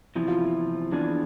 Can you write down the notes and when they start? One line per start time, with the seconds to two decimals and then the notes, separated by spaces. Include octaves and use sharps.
0.15 E2 C3 F3 E4
0.28 F4
0.41 E4
0.92 F2 E3 B3 D4 F4 G#4